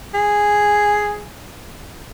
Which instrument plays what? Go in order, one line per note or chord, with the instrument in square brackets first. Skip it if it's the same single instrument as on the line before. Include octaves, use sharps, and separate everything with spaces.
[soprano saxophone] G#4